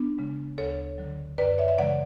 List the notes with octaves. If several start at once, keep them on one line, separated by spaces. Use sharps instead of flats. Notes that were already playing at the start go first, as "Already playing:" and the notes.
Already playing: B3 D4
C#3 G#3
D2 A4 C#5
D3 F#3
F#2 B4 D5
C#5 E5
E5
C#3 E3 G#3 D5 F#5